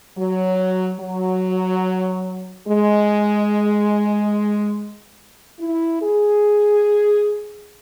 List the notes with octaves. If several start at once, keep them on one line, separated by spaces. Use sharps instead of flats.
F#3
F#3
G#3
E4
G#4